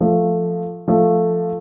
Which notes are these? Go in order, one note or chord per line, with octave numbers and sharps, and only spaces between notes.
F3 A3
F3 A3